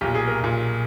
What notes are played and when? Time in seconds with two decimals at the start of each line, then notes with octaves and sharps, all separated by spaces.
0.01 B1 A#2 G4
0.15 G#4
0.27 A#4
0.41 B1 A#2